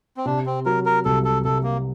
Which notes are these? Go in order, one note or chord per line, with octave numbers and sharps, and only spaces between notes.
C4
C3 D4
C4
F#3 A#4
A#4
C2 A4
A4
C2 A4
A#3